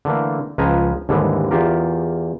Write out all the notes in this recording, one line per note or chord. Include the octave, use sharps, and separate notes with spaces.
D3 E3 A3 A#3
C#2 F3 B4 G#5 A#5
D#2 G#2 D3 E3 G3 G#3
E2 F4 G4 A#4